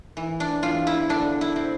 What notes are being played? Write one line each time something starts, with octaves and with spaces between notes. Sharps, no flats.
E3
D4
E2 F4
E4
D3 D4
E4
C4